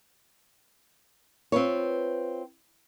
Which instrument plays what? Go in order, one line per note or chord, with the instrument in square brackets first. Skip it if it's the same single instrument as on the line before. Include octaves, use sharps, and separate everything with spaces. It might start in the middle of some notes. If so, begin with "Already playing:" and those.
[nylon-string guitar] C4 F4 B4 C#5